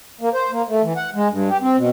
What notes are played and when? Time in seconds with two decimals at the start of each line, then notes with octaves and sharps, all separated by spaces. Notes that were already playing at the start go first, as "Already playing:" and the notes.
0.21 A#3
0.34 C5
0.51 A#3
0.69 A3
0.83 E3
0.97 F#5
1.15 G#3
1.31 G2
1.49 G4
1.62 C4
1.77 B2